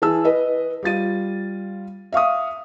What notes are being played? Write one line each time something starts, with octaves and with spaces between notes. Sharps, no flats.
E3 G#4 A5 E6
B4 D#5
G3 F4 A6 D#7
E5 F5 C#6 D#6